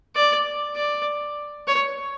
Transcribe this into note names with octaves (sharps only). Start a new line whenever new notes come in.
D5
D5
C#5